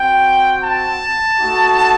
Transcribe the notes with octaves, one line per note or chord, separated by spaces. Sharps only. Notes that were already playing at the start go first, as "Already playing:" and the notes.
Already playing: C4 F#4 G5
A5
A3 D#4 F#4